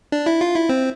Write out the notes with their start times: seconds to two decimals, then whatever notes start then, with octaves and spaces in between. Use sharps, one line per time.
0.12 D4
0.26 E4
0.41 F4
0.55 E4
0.69 C4